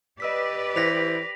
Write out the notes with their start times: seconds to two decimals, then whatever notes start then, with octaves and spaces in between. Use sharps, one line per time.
0.20 G4 B4 D5 D#5 E6 B6
0.76 E3 C5 A#6 B6 F7